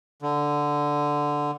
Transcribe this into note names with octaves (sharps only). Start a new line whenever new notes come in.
D3